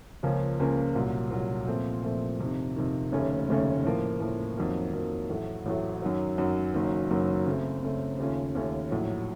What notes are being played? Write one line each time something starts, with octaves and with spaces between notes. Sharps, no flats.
C#2 C#3 F3 A#3 C#4
C#2 C#3 F3 A#3 C#4
C2 A#2 F#3
C2 A#2 F#3
A#2 F3 A3 C4
A#2 F3 A3 C4
F2 C3 D#3
F2 C3 D#3
F1 D#2 C#3 A3 C#4
F1 D#2 C#3 A3 C#4
A2 F3 A#3
A2 F3 A#3
F2 D#3 F#3 A#3
F2 D#3 F#3 A#3
A1 A2 F#3 A3
A1 A2 F#3 A3
F#2 D#3 F#3
F#2 D#3 F#3
F#1 F#2 D#3 F#3
F#1 F#2 D#3 F#3
C#3 A3 C4
C#3 A3 C4
D#2 C#3 A3 C#4 F4
D#2 C#3 A3 C#4 F4
A#1 A2 F#3